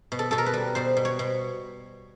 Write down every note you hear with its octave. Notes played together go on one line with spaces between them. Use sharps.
B2
A4
B2 A4
A#4
B4
G3
B2 C5
B2
C#5
B2